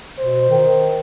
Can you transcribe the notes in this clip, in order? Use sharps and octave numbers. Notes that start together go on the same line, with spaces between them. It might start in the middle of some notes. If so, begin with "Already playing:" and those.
B2 C5
D#3